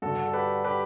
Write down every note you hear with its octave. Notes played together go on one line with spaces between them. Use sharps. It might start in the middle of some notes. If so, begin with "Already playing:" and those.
G2 D3 F#4 A4
A4
G4 B4
G4 B4